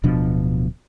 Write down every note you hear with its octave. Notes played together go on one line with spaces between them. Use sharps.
D1 B2 F3 D4